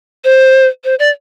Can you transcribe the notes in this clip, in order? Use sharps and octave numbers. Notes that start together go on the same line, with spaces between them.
C5
C5
D5